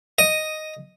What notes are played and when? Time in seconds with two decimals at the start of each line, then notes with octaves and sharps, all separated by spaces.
0.19 D#5